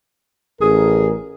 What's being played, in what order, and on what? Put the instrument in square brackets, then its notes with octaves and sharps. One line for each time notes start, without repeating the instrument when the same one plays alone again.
[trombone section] A1 A#4 [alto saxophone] G#4